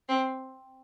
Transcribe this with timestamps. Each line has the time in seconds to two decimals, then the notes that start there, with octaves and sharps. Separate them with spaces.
0.09 C4